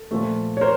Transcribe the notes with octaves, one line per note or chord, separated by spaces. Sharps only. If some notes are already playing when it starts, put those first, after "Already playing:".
Already playing: A4
A#2 F3 A3
C#5
A#4 C5